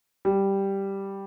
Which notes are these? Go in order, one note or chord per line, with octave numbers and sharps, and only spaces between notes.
G3